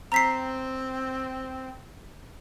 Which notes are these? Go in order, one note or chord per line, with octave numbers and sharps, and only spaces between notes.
C4 A#5 B6 C7